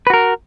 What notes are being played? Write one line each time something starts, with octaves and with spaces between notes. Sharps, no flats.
F#4 A#4 B4